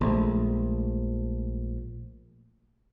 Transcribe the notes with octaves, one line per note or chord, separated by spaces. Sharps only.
A#1 F3 G#3 A3